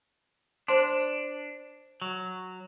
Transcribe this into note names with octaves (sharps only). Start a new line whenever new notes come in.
D4 C5 C6
F#3